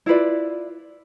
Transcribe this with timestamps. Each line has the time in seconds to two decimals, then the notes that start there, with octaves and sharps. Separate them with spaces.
0.06 E4 F4 B4 D5